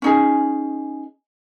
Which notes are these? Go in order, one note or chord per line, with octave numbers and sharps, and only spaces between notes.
C#4 D#4 G#4